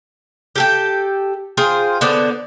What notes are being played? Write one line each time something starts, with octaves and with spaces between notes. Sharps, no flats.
G4 A4 G5
F4 G#4 C5 G5
D3 B3 C5 D5